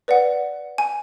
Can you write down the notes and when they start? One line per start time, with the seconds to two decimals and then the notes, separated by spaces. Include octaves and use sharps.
0.08 B4 D5 F#5
0.78 G#5